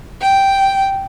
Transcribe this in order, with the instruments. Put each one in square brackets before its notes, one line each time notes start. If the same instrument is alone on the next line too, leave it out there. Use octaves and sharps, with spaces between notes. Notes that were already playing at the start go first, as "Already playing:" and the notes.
[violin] G5